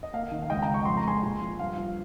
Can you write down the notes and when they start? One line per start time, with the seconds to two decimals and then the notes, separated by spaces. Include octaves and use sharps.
0.03 D#5
0.13 A#3 F5
0.32 D#3
0.42 F5
0.50 C#2 D#5 G5
0.62 G5 A#5
0.68 C#2
0.74 C#6
0.85 F2 C6
0.97 A#5
1.05 G#3 G#5 C6
1.23 A#2
1.41 F3
1.59 G2 F5
1.77 F3